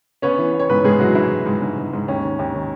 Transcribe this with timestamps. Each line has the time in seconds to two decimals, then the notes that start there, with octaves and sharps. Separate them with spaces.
0.22 B3 C#4 C#5
0.38 E3
0.53 B3
0.60 C#5
0.69 G#2 B3 B4
0.84 G#2 G#3 G#4
1.00 E3 F#3 F#4
1.15 G#2 E3 E4
1.31 G#2
1.46 G#2
1.62 G#2
1.78 G#2
1.93 G#2
2.08 D#2 C#4
2.24 D#3
2.39 D#2
2.54 D#3